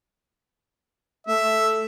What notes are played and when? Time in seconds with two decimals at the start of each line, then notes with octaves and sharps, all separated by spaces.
1.27 A3 E5